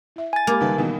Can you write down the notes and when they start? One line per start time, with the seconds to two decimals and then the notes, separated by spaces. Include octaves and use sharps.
0.16 E4 E5
0.33 G#5 A6
0.47 G#3 A#3 G4 B5
0.61 C#2 D#3 G3 A4 B4 A5
0.78 B2 D#3 E3